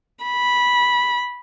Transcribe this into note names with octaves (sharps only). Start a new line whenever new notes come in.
B5